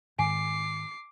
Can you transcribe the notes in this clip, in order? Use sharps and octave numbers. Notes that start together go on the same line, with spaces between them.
G#2 D#3 G#5 D6 C7